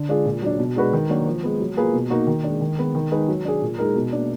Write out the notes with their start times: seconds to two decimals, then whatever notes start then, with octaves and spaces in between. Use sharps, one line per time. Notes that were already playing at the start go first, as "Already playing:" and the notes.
Already playing: D3
0.09 G#3 D4 F4 G#4
0.26 A#2
0.42 F#3 D4
0.59 B2
0.76 G#3 D4 F#4 B4
0.93 D#3
1.10 F#3 A#3 D4 F#4
1.26 F3
1.43 G#3 B3
1.60 F#3
1.77 A#3 F4 G#4 B4
1.94 B2
2.10 A#3 D#4 F#4
2.27 D#3
2.44 G#3 D4
2.61 D#3
2.78 G#3 B3
2.95 D#3
3.11 G#3 D#4 G#4 B4
3.28 F#3
3.45 D4 G#4
3.62 A#2
3.79 G#3 D#4 A#4
3.96 B2
4.13 A#3 D4